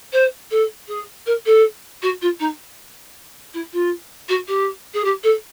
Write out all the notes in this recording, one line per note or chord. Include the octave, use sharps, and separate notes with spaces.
C5
A4
G#4
A#4
A4
F#4
F4
D#4
E4
F4
F#4
G4
G#4
G4
A4